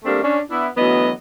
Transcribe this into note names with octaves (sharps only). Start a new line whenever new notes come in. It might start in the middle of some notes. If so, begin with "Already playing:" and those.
G3 A3 A#3 C4 D4
C#4 D4
B3 D4 E4
D2 E3 F#3 B3 D#5